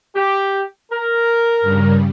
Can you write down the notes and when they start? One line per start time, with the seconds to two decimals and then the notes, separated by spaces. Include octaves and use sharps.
0.14 G4
0.92 A#4
1.61 G2 C#3 G3